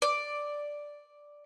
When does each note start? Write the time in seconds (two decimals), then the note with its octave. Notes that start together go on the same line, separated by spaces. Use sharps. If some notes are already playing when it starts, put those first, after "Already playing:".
0.02 D5